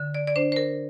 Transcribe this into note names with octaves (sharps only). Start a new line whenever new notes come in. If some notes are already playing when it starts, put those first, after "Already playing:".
Already playing: D3
D5
D5
D4 C5
C5
A#4